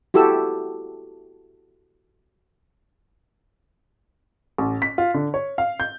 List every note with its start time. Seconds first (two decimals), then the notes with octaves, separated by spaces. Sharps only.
0.14 E4 F#4 G4 A4 E6
4.58 A1
4.82 B6
4.98 F4
5.14 D3
5.34 C#5
5.58 F5
5.80 G6